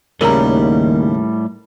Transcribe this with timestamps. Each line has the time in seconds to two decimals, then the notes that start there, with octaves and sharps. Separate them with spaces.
0.21 D#2 A2 C#3 G3 A#4 A#5